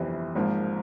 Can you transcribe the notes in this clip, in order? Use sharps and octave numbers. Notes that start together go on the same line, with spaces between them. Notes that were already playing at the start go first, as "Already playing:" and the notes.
Already playing: G1 F2 C3 E3
G#1 G#2 F3 A#3